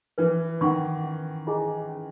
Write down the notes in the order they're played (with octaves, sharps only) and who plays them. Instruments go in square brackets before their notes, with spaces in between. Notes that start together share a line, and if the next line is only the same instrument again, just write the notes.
[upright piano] E3 [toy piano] B4
[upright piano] D#3 [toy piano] F#5 C#6
[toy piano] C#4
E4 G#4 D#5 G#5
C#4